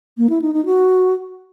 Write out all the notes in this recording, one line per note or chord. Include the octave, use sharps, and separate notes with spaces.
A#3
E4
D#4
D#4
F#4